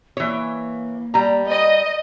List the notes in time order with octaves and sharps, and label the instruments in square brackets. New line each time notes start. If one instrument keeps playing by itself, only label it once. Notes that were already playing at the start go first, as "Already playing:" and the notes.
[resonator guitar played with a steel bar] E3 C#5 [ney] A#3
[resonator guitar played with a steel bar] G3 A#5
[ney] D5 [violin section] D#5